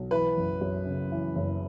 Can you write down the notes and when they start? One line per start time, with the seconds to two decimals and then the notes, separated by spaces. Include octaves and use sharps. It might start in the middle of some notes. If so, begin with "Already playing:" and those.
Already playing: B1
0.11 E3 B4
0.37 F#1
0.61 F#2
0.86 C#3
1.12 E3
1.36 F#1